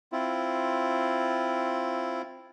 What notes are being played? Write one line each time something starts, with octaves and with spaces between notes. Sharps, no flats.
C4 E4 F4